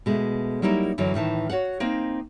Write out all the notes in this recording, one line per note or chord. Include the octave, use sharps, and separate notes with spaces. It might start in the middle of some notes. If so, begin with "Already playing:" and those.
B2 G#3 A3
F#3 G3 A#3 D#4 E4 A#4
F#2 D3 E3 F#3
A2 D#3 E3 A5
F#4 C#5 F5 F#5
A#3 C4 D#4